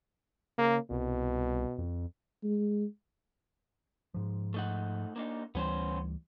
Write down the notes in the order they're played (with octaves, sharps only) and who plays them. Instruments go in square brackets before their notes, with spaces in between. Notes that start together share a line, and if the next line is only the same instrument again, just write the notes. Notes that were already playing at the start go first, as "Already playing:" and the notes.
[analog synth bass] C#3 [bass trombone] A#3
[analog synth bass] C2 [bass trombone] B2
[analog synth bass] F2
[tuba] G#3
[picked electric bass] G#2 F3
[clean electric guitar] A3 D#4 F#5
A#3 D4 D#4
[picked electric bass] D2 E3 G3 [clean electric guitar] B3 C#4 C5